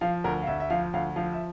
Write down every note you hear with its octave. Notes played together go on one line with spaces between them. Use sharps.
F3 F5
D2 A#4
F5
D2 E5
E5
F3 F5
D2 F5
F3 F5
E5